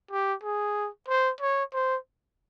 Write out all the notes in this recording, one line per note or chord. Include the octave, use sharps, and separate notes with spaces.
G4
G#4
C5
C#5
C5